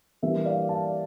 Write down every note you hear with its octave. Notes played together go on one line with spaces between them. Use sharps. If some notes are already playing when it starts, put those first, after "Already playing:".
E3 G3 A#3 D4 E5
D5 F5
F5 A5